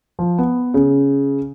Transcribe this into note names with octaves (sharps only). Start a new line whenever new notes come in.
F3
B3
C#3